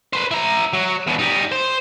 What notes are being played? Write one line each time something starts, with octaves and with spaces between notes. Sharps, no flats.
B4 C5
E4 A#5
F#3
E2 B2
G3 D#4
C5